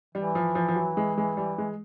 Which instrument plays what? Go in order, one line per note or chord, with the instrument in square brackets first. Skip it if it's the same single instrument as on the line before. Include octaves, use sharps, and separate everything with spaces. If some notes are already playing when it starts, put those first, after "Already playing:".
[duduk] E3 [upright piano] G3
[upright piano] F3
F3
F3
F#3
G#3
G#3
G3
G#3